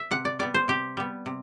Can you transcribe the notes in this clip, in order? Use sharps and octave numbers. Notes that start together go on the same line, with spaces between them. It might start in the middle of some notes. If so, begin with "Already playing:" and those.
Already playing: E5
C3 F#5
D5
G3 B3 D5
C5
C3 G4
G3 B3
C3